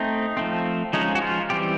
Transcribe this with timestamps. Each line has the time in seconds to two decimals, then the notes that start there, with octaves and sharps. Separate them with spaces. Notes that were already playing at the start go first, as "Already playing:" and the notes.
Already playing: A3 C4 D#4
0.37 F3 A3 C4
0.93 F3 G#3 C#4 D#4
1.15 F#4
1.22 F4
1.50 E3 G3 C4 G4